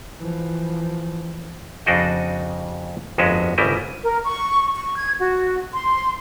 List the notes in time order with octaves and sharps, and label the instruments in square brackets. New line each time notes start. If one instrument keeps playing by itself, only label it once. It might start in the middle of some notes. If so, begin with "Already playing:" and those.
[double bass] E3 F3
[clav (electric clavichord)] F2 C#3 D4 D#4 F#4 D#5
G1 F2 G#3 C#4 F#4 E5
G1 C2 C#3 G3 E4 D#5
[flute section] A#4
C#6
C#6
G#6
F#4
C6